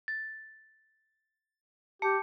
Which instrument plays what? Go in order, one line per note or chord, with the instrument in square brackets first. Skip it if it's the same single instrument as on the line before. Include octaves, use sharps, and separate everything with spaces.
[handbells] A6
[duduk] G4 [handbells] A5 C#7